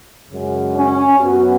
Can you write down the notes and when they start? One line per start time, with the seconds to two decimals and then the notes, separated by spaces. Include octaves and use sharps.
0.30 F#2 C#3 G#3
0.75 C#4
1.18 F#2 F#3 B3 F#4